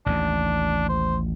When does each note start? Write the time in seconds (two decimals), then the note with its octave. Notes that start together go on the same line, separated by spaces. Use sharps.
0.06 A1 D#2 D4
0.89 C5